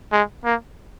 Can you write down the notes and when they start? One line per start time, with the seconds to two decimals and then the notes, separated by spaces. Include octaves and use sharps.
0.12 G#3
0.45 A#3